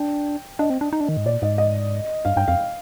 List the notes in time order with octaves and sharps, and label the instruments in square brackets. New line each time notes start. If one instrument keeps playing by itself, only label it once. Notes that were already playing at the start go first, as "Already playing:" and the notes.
Already playing: [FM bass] D4 [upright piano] G5
[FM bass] D4 [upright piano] D#5
[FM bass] C4
D4
D#4
D4
D#3
G#2
[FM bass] A#2 [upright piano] D5
[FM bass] G#2 [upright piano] D#5
[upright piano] D#5
[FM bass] G2 [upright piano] F5
[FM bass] G2 [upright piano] G5
[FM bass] F2 [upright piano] F5